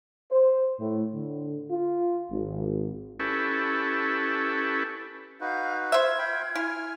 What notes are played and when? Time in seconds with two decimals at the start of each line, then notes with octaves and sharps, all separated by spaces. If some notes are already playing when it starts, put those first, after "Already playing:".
0.32 C5
0.80 A2
1.14 D3
1.71 F4
2.31 G#1
3.20 C#4 E4 G4 A4 B4
5.41 D#4 F#4 B4 F5 G6
5.92 F4 C5 E5 G#6
6.19 G5 B5
6.55 E4 G#5 F6